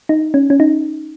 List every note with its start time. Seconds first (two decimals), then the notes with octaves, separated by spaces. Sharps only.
0.09 D#4
0.34 C#4
0.50 C#4
0.60 D#4